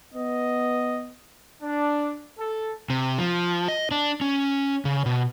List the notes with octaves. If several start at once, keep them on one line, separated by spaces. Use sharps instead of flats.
B3 D#5
D4
A4
C3
F3
D#5
D4
C#4
C#3
B2